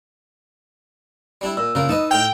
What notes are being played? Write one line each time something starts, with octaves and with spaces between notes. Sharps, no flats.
G3 D4 E4
A#2 E6
A#1 C#3 A#4 D5
D#4 B4 D#5 A5
A2 F5 G5